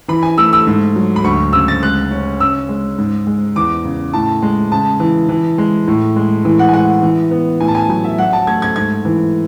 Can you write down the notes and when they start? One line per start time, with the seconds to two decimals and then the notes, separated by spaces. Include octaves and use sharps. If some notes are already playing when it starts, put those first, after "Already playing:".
0.08 E3 B5
0.23 G#5
0.38 A3 E6
0.53 E6
0.67 G#2
0.96 F#3
1.16 B5
1.24 D2 C#6
1.53 C#3 E6
1.68 A6
1.82 G#3 F#6
2.11 C#4
2.40 C#3 E6
2.69 G#3
2.98 G#2
3.27 G#3
3.56 E2 D6
3.84 C#3
4.13 A2 A5
4.42 G#3
4.72 C#3 A5
5.00 E3
5.29 E3
5.58 G#3
5.88 A2
6.16 G#3
6.45 E3
6.59 F#5
6.69 G#5
6.73 G#3 F#5
7.03 E3
7.31 B3
7.61 A2 G#5
7.68 A5
7.75 G#5
7.89 F#3 G#5
8.04 E5
8.18 F#3 F#5
8.33 A5
8.47 A3 G#6
8.62 G#6
8.76 G#2 G#6
9.05 E3